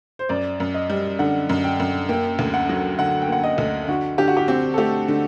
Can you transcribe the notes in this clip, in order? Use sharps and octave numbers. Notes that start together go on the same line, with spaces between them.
C5
F#2 D5
F#2
D#5
G3
D3 F#5
F#2
G5
F#2
A#3 G5
D2
F#5
F#3
D3 F#5
G5
A#3 F#5
D#5
D2
D3 F#4
D3 G4
F#4
G4
C4 G4
A4
A3 G4
D3